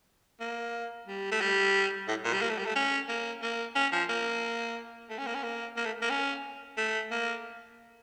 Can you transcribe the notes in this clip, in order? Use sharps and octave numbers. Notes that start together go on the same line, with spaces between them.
A#3
G3
A3
G3
A2
A#2
G3
A#3
A3
G3
A3
C#4
A#3
A#3
C#4
F3
A#3
A3
C#4
A#3
C#4
A#3
A#3
A3
A#3
C#4
A3
A#3